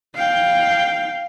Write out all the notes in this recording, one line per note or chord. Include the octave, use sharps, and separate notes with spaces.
F5 G5